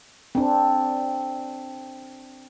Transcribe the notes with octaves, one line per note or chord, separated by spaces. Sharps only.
C4 D4